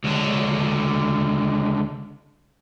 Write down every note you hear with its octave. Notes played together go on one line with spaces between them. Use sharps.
C#2 D3